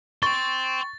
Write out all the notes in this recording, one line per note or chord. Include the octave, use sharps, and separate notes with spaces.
G5 C6 C#6 A6